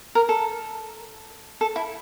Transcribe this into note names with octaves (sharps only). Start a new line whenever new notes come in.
A#4
A4
A4
E4